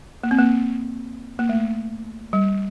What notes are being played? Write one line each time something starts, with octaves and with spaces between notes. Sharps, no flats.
A#3
C4
A#3
A#3
A3
G3